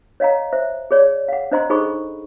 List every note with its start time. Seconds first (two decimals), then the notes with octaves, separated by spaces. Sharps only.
0.20 C#5 D#5 F5 F#5 A#5
0.53 C5 E5
0.91 G#4 C#5 D5
1.28 F5 F#5
1.52 D4 C5 D#5 A#5 C6
1.70 D#4 G#4 A4 C5 B5 C#6